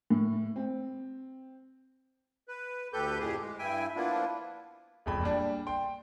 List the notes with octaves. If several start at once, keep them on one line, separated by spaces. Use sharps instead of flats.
A2
C4
B4
D2 G4 A4 B4 G6
F2 A2 G4 G#4
G#3
G2 E4 E5 G5 G#5
F3 A#3 B3 D4 E4 F4
E1 F2 B5
A#2 G3 D4
G5 C6